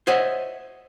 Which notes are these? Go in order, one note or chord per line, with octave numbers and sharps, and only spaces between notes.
C5 C#5 D#5 E5 F#5